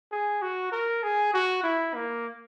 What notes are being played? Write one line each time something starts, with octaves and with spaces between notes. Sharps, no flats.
G#4
F#4
A#4
G#4
F#4
E4
A#3